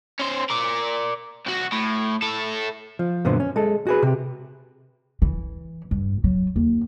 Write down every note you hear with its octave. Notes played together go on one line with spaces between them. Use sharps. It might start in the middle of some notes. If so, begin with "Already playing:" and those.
C#4 C5
A#4 D5
C2 F#4
A2
E4 A4
F3
F#2 A#2 D3 B3 C5
C#4
G#3 A4
F#4 G#4 B4
C3 G4
E3
G2
F#3
D#2